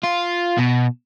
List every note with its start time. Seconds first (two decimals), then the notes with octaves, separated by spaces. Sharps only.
0.04 F4
0.59 B2